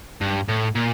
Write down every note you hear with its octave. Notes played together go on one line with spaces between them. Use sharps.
G2
A2
A#2